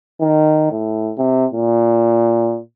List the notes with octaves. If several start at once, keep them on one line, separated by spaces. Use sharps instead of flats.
D#3
A2
C3
A#2